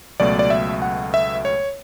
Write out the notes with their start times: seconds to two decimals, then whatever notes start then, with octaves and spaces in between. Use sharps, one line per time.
0.20 C#2 B2 F#3 A3 D5
0.39 D5
0.50 E5
0.82 F#5
1.14 E5
1.45 C#5